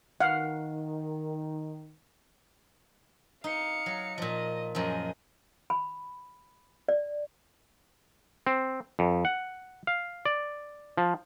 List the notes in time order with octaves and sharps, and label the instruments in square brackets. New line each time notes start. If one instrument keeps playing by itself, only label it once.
[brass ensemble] D#3 [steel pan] F5 F#5
[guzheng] D#4 [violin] F5 C#7
[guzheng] F#3
[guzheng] A#2 F3 [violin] D#5
[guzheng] F#2 F3 [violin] G#4 D#5
[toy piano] B5
D5
[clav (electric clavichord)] C4
F2
F#5
F5
D5
F3